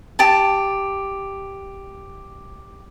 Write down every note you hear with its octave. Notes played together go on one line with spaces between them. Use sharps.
G4 A5